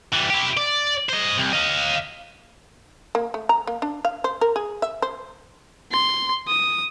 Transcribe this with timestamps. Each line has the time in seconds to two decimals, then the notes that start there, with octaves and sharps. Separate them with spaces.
0.13 E3 G3
0.30 E4 G4
0.57 D5
1.09 C5 D#5
1.37 C2
1.53 D#5 F5
3.15 A#3
3.34 A3
3.49 A#5
3.67 A#3
3.82 D4
4.05 F5
4.24 C5
4.41 A#4
4.56 G#4
4.82 E5
5.02 C5
5.92 C6
6.48 D#6